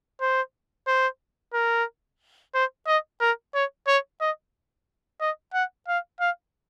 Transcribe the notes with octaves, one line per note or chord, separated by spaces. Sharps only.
C5
C5
A#4
C5
D#5
A#4
C#5
C#5
D#5
D#5
F#5
F5
F5